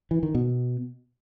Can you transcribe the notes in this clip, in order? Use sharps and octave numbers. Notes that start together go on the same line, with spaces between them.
E3
D#3
B2